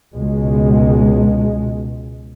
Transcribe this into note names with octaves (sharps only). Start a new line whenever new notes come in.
C#2 B2 G#3